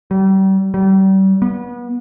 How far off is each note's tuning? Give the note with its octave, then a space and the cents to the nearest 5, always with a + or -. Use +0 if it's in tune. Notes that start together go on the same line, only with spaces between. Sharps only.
G3 -35
G3 -35
B3 -30